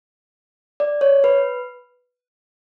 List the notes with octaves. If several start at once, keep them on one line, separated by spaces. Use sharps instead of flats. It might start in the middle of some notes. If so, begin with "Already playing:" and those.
D5
C#5
B4